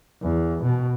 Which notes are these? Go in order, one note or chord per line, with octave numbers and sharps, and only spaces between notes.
E2
B2